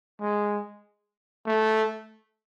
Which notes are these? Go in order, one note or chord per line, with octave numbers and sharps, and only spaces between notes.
G#3
A3